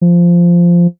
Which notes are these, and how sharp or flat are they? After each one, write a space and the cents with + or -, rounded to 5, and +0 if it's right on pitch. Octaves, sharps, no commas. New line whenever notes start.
F3 -10